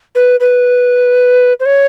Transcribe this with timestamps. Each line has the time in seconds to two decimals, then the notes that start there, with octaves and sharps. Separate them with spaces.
0.15 B4
0.40 B4
1.60 C5
1.65 C#5